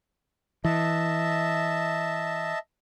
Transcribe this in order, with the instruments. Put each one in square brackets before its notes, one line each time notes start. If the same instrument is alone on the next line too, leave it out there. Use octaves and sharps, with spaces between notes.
[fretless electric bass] E3 [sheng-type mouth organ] D#5 E5 A5